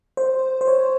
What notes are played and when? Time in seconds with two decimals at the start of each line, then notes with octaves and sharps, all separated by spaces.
0.17 C5
0.61 C5
0.68 C#5